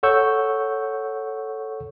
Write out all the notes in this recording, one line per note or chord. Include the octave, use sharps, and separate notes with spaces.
A4 C#5 F#5 C#6 E6 G6